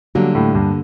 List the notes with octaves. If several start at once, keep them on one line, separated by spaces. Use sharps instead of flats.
D3 F#3 G3 A#3
A2
G2